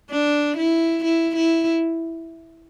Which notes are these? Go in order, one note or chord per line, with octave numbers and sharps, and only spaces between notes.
D4
E4
E4
E4